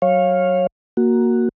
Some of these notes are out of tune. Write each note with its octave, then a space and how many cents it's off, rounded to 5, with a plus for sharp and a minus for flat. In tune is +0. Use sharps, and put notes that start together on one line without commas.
F#3 +20 C#5 -20 F5 +0
A#3 +5 F#4 +0